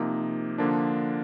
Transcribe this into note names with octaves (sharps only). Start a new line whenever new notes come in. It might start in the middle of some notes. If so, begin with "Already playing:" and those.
Already playing: C3 F3 A#3 D#4
D3 F3 A#3 D4